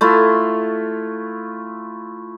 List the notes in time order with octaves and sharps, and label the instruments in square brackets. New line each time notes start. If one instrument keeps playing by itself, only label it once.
[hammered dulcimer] A3 E4 F4